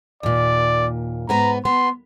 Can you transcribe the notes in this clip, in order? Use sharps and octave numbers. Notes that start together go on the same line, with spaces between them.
D#2 A#2 D5
G#2 B3 B4 A#5
B3 C6